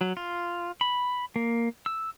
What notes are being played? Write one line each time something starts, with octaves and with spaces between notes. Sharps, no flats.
F#3
F4
B5
A#3
E6